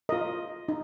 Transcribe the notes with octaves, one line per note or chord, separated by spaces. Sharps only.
F4 A#4 D#5
D#4